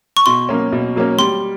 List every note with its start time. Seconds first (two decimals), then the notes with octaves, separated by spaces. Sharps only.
0.17 C#6
0.26 B2 C6
0.49 F#3 A#3 C#4
0.72 B2
0.96 F#3 A#3 C#4
1.18 G3 C6